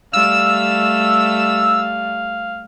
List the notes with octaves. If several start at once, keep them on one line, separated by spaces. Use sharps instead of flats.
G3 A3 F5 E6